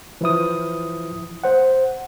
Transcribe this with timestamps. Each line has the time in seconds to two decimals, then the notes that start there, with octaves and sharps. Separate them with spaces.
0.21 E3 F3 E4 D#6
1.44 C5 F#5